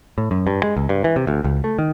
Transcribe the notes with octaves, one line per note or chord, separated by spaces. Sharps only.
A2
F#2
G2
G#3
C#2
G2
E3
C3
D2
C#2
A3
D#3